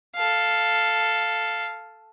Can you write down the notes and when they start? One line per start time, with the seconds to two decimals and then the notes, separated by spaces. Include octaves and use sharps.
0.15 A4 F5